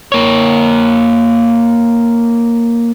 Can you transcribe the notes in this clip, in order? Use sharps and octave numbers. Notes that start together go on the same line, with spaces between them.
A#3 C#5